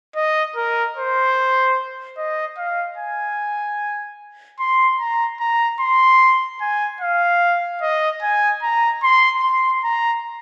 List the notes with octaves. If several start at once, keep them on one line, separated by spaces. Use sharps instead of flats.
D#5
A#4
C5
D#5
F5
G#5
C6
A#5
A#5
C6
G#5
F5
D#5
G#5
A#5
C6
C6
A#5